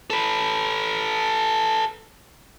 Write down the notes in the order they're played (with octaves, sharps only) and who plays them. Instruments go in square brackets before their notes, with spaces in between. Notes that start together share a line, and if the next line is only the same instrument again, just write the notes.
[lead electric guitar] A4 B4